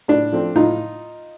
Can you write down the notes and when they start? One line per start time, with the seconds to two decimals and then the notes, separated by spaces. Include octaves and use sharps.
0.08 A2 D4
0.32 F3 A3 C4
0.56 A2 D#4 F4